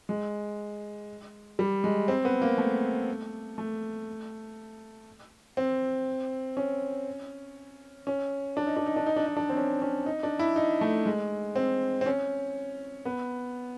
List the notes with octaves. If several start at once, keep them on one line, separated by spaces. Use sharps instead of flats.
G#3
G3
G#3
C4
B3
A#3
A3
A3
C4
C#4
C#4
D4
D#4
D4
D#4
D4
D#4
D4
D#4
D4
C4
C#4
C#4
D#4
D4
E4
D#4
A3
G#3
C4
C4
C#4
B3